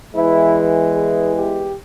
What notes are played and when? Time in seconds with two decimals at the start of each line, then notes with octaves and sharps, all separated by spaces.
0.14 E2 E3 G#3 E4
0.94 G#4
1.34 G4